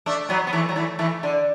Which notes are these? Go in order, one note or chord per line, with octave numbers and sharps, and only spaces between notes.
A3 D4
F#3 B3
B3
E3 A3
F#3
E3 A3
E3 A3
D3